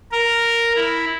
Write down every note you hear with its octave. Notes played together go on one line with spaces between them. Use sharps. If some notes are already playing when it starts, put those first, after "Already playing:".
A#4
E4